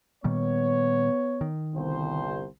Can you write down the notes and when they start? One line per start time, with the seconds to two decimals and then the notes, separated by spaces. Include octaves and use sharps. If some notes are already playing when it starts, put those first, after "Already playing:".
0.24 A#2 D#3 G3 B3 C#5
1.41 D#3
1.75 G1 C2 C5